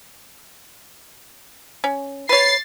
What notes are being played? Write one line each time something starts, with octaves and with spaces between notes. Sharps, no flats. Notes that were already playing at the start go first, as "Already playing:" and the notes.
C#4
B4 C#5 A6 C7